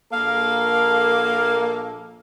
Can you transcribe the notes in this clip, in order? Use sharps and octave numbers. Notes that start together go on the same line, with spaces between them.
A#1 A#3 A4 F5